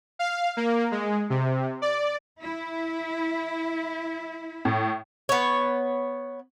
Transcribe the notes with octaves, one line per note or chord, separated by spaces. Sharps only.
F5
A#3
G#3
C3
D5
E4
A2
B3 C#5